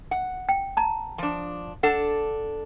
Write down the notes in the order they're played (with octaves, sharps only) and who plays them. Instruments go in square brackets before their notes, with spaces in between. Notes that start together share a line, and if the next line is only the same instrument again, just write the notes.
[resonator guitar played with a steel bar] F#5
[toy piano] G5
A5 A#5
[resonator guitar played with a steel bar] F3 D4
[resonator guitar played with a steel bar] D4 A4 [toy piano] F#5